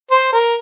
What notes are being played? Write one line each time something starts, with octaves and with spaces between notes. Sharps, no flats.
C5
A#4